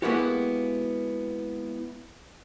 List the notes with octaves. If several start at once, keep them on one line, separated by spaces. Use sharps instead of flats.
G#3 A#3 B3 E4 F#4 G4